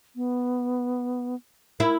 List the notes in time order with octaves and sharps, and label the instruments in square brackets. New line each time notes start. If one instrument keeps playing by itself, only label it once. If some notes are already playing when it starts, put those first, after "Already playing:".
[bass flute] B3
[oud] E4 [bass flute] A#4